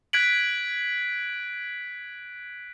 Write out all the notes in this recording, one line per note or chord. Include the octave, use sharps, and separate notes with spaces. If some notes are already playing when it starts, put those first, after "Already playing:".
F#6 G#6 B6 D7 F#7